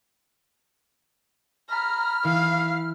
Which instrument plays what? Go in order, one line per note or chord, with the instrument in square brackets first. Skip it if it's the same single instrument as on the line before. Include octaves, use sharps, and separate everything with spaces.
[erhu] A#5 [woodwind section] B5 F6
[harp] E3 E4 [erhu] F5